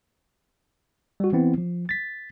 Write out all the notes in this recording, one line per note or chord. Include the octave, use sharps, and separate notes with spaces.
G3 F#4
E3 B3 C4 E4
F3
A6 B6